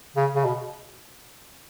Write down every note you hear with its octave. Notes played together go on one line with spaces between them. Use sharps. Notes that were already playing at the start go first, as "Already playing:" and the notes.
C#3
C#3
B2